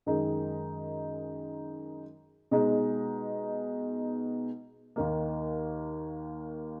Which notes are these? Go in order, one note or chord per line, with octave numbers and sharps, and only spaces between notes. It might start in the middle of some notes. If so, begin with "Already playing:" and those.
F#2 D#3 G#3 D#4
B2 G#3 D#4
D#2 D#3 A#3